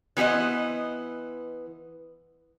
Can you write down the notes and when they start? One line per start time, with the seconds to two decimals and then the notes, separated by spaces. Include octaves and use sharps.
0.17 E3 B3 G4 C5 D#5